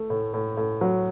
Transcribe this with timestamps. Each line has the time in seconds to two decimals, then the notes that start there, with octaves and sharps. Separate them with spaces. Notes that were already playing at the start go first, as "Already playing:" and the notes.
Already playing: A3
0.10 A2
0.34 A2
0.57 A2
0.81 F#3